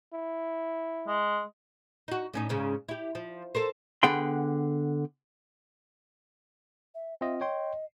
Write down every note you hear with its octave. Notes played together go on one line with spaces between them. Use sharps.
E4
G#3
D#4 F#4
A2 C#4 D#4
G#2 C#3 C#4
E4 G4
F3
A4 A#4 C5
D3 B3 G#4 F#5 G5 C6
E5
C4 F4 D#5 E5
C#5 D#5 G5 C6